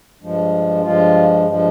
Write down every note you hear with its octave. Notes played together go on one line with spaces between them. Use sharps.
G2 F3 G#3
G2 F3 G#3 F4
G2 F3 G#3